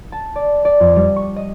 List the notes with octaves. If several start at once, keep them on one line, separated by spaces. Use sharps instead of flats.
A5
D5
D5
F2
G3
C#6
D#5